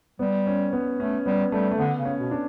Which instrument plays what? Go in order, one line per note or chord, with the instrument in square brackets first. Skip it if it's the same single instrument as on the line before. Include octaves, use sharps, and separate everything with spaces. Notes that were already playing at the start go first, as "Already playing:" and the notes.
[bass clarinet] G3 [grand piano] B3
[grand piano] C#4
B3
[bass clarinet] A3 [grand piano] C#4
[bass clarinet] G3 [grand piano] B3
[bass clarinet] G3 [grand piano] A3
[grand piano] A3
[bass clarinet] D3 [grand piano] B3
[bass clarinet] C#3
[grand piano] C#4
[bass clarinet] B2
[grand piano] D4